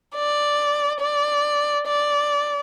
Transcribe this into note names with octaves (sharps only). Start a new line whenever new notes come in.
D5
D5
D5